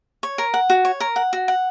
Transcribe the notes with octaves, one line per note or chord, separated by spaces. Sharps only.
C#5
A#4
F#5
F#4
C#5
A#4
F#5
F#4
F#5